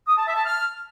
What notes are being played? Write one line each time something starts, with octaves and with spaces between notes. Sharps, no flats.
D#6
A5
E5
A5
F6